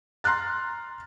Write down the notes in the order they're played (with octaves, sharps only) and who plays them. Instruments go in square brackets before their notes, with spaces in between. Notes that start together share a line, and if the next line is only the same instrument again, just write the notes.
[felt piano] A#5 C6 F6 F#6 A6